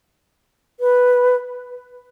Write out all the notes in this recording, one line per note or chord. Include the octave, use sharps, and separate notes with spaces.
B4